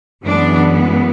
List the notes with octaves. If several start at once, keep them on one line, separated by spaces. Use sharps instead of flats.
F#2 E3 G#3 B3 D4